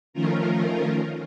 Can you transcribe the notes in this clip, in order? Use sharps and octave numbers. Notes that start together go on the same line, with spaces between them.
D#3 F3 A3 C#4 F4 A#4